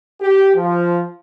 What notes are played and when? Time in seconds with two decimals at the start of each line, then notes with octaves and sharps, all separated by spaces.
0.22 G4
0.55 F3